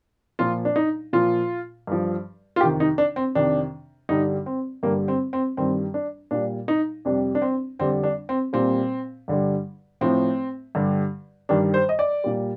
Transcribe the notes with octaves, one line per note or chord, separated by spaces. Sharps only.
A#2 F3 F4
D4
D#4
A#2 F3 F4
G2 F3
F4
F2 C3 D#3 G4
D#4
D4
C4
F2 C3 D#3 D4
G2 D3 G3 D#4
C4
G2 D3 G3 A#3
C4
C4
G2 D#3 G3 C4
D4
A#2 G3 D4
D#4
F2 C3 G3 D4
D4
C4
F2 D3 G3 C4
D4
C4
A#2 G3 C4
G2 D3 G3
A2 F3 C4
G2 D3 G3
G2 D#3 G3 D4
C5
D#5
D5
A#2 G3